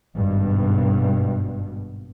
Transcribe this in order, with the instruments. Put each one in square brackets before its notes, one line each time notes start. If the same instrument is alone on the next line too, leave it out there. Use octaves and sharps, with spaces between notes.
[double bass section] G#1 G2 B2